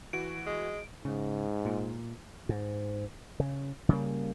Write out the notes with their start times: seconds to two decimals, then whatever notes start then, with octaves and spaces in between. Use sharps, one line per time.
0.13 E3 F#4 D7
0.47 G#3
1.05 G#2 C#3
1.65 A#2
2.49 G#2
3.40 C#3
3.89 C#3 G3 G#3 A#3